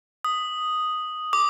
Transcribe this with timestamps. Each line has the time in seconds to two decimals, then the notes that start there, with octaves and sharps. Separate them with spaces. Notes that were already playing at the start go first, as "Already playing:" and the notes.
0.25 D#6
1.33 D6